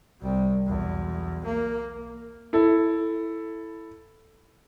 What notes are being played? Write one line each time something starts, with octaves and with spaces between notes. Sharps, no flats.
C2 G3
B1 E2
A#3
E4 A4